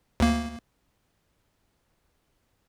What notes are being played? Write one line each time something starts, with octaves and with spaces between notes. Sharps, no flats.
D2 A#3